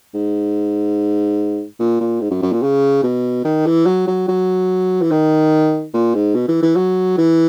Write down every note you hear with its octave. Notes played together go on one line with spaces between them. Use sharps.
G#2
A#2
A#2
G#2
F#2
F#2
A#2
C#3
B2
D#3
E3
F#3
F#3
F#3
E3
D#3
A#2
G#2
B2
E3
E3
F#3
E3